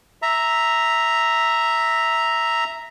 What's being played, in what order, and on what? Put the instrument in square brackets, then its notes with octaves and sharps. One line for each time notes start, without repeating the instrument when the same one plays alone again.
[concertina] E5 A#5